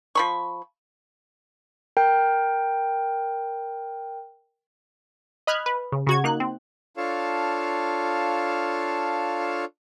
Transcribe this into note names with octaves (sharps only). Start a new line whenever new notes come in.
F3 B5 C#6
A#4 G5
D#5 B5 F6 F#6 G#6
B4
C#3
C#3 F#4 G#6
A#3 D#4 F#6
C4
D4 F4 A4 C#5 F5 A5